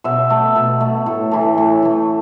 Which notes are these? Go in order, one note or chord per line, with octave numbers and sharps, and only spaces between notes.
B2 E5
A3
B2
A3
A2
E3 A3
A2
E3 A3